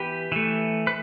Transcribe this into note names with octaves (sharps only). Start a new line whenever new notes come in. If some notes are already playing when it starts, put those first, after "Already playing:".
Already playing: E3 B3 G4 B4
E3 A3
B4